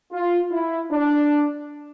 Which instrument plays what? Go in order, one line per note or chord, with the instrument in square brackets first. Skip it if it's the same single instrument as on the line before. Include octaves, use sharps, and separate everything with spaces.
[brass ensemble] F4
E4
D4